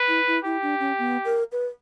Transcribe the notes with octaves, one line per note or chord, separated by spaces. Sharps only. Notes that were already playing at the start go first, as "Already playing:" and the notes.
Already playing: B4
E4
E4
E4 G4
D4
C#4
B3
A#4
B4